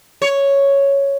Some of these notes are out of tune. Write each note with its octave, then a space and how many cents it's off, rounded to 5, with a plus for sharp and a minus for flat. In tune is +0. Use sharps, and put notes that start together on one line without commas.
C#5 +0